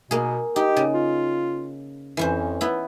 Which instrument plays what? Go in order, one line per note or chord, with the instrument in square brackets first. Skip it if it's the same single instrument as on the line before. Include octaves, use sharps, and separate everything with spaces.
[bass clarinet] B2 [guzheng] A#3 G#4
[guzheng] D#4 [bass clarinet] G4
[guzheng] C#3
[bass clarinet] F4
[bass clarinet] F2 [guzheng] E3 C#4 C5
[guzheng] B3 E4